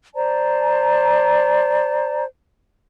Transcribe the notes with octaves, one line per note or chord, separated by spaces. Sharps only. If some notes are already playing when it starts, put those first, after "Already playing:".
C5 D5 A5 A#5